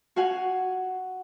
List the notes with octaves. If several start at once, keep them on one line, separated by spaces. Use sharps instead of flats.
F#4 F5 F#5 G#5